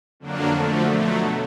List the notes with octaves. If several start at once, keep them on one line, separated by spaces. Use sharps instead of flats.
F2 D3 F#3 A#3 D4
D3 F3 A3
B2 F#3 A3